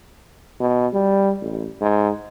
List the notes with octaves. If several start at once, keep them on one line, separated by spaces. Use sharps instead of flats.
B2
G3
A1
G#2